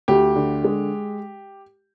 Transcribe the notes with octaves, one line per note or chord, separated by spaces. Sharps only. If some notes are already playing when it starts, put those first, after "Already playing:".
D2 G4
D3
G#3